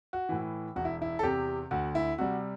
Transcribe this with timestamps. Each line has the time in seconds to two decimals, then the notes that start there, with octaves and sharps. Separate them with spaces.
0.13 F#4
0.29 A2 E3
0.76 E1 F#4
0.85 E4
1.02 E4
1.19 A4
1.23 E2 C3 G4
1.71 D2 F#4
1.95 E4
2.18 C3 G3 F#4